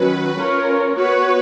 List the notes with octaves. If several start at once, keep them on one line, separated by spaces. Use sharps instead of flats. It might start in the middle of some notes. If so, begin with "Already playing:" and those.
Already playing: D#3 F#3 C#4 F#4 B4
C#4 F4 A#4 C#5
B3 F#4 B4 C#5